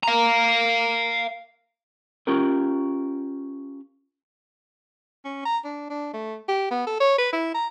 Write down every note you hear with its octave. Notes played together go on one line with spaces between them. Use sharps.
F5 A#5
C#4 F4 G4 A#4
C#4
A#5
D4
D4
A3
G4
B3
A4
C#5
B4
E4
A#5